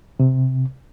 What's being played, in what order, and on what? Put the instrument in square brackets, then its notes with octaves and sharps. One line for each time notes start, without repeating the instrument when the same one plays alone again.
[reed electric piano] C3